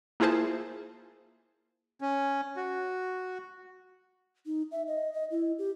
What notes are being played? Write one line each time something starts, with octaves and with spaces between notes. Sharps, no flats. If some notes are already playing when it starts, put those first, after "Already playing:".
A#3 E4 F4 G#4 C5 A5
C#4
F#4
D#4
E5
D#5
D#5
E4
G4